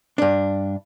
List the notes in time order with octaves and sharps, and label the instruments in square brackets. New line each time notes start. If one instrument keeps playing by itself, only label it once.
[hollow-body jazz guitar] G2 D4